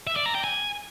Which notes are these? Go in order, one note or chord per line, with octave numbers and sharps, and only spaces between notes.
E5
D5
A#5
G5
G#5